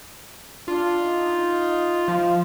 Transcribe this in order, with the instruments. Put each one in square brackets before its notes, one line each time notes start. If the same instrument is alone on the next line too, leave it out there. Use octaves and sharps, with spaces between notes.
[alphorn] D4 [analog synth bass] F4
[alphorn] D#4
[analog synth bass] F3 [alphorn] F4